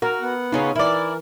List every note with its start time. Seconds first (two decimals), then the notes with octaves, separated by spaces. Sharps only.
0.02 F#4 A#4
0.21 B3 F#5
0.52 C#3 C#4 D#4 F4
0.75 E3 E4 A#4 D5